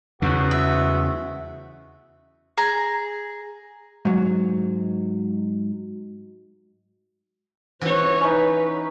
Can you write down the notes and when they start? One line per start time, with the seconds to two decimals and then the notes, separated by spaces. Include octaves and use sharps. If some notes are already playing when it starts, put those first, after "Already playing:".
0.22 E2 C#3 G#3 B3 F#4
0.51 E5
2.57 G#4 A#5
4.05 G#2 F#3
7.81 E3 F#4 C5 C#5
8.21 C#4 D#4 B4